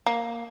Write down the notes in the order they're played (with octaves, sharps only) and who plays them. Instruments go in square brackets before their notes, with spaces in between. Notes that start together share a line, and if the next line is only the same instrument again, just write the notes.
[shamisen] A#3